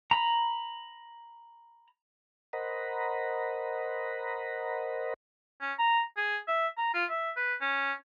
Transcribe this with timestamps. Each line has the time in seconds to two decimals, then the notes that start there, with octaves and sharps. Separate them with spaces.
0.11 A#5 B5
2.53 A#4 C5 D#5 F#5 A#5 B5
5.61 C#4
5.79 A#5
6.17 G#4
6.48 E5
6.78 A#5
6.94 F4
7.10 E5
7.37 B4
7.61 C#4